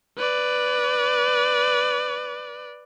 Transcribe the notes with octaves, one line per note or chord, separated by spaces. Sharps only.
B4 D5